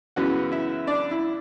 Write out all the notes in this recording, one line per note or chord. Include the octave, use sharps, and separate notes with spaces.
F#2 C#3 E3 B3 F#4 F#5
E4 E5
D4 D5
E4